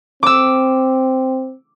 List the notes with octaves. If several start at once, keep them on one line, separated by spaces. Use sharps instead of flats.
C4 D6 E6